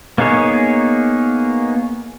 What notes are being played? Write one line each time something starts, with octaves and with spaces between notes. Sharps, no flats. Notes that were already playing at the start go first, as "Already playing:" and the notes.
A#3 B3 D#4 G#4 C#5